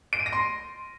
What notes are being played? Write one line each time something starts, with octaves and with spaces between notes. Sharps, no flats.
D7
D#7
A#6
C6